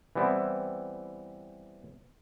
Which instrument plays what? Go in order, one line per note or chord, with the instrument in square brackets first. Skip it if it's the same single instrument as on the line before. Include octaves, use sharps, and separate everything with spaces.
[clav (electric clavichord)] E3 G3 B3 C4 E4